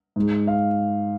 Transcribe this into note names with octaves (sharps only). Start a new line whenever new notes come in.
G#2 G#3
F5